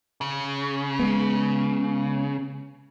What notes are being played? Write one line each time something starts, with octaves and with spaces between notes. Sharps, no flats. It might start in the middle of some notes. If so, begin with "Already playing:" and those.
C#3
G#3 B3